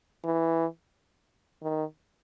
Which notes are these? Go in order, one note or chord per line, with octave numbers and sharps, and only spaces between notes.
E3
D#3